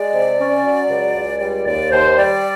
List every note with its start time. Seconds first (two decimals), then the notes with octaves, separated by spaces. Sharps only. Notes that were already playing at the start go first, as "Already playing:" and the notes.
Already playing: G#3 D5
0.14 C3
0.39 C#4
0.64 F#3
0.90 C#2
1.16 C#2
1.40 G3 D5
1.66 D#2 D5
1.91 D#2 C5
2.17 G3 D5